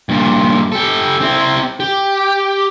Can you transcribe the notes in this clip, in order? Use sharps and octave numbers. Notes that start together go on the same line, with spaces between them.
G2 A#2
G4 A4
C4 E4
G4